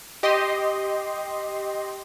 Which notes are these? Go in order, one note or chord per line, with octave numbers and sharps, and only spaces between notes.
G4 D#5 C6